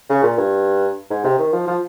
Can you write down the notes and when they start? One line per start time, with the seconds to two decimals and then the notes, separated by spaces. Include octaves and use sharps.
0.09 C#3
0.23 A#2
0.38 G2
1.10 G#2
1.24 C3
1.38 D#3
1.53 F3
1.68 F3